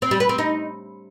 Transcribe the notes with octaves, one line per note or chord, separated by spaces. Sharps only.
C4
G3
B4
C4
D#4